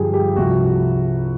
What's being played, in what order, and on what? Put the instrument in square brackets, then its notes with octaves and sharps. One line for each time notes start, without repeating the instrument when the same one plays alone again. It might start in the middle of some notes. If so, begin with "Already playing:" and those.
Already playing: [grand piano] G2 D3 F3 G4 G#4
G4
C2 C3 F3 F#4